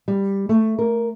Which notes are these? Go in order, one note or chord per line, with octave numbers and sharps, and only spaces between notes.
G3
A3
A#4